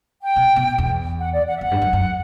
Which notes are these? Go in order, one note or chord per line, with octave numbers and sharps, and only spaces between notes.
G5
B2
B2
E2
F#5
D5
F#5
E5
E2 F#5
G2
F#2
F#2